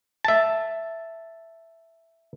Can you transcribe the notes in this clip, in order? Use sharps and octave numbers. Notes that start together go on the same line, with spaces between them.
E5 A5